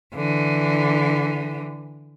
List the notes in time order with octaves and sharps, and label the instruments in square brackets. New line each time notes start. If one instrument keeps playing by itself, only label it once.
[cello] D3 E3